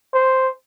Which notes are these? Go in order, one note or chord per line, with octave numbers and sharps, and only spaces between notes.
C5